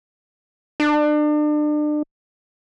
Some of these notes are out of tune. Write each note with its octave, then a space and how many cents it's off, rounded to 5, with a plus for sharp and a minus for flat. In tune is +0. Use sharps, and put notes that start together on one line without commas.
D4 +35